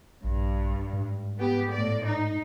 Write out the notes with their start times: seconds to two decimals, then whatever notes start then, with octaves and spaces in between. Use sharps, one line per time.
0.24 A#1 G2
0.93 G#2
1.38 B3 G4
1.71 A2 D5
2.04 D#4